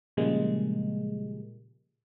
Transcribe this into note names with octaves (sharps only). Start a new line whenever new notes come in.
A#2 C#3 F3 G3 G#3 A#3